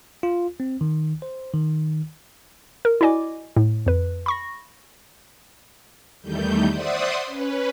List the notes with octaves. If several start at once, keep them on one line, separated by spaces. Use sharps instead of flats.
F4
C4
D#3
C5
D#3
A#4
E4 F#4 D5 D#5 G#5 D6
A2
F2 B4
B5 C#6 A#6
E2 D#3 G3 A3 G6
C5 D5 E5 F#5 C6 D#6
C#4 B4